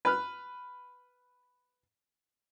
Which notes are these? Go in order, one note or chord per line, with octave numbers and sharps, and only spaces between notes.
B4 F6